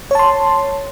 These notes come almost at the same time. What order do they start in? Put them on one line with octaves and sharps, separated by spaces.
C#5 A5 C6